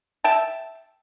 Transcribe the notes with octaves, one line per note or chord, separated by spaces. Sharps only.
E5 G5 A5